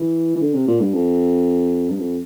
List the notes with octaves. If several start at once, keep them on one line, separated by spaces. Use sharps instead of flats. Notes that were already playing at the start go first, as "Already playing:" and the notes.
Already playing: E3
E3
D3
C3
A#2
G2
F2
G2
F2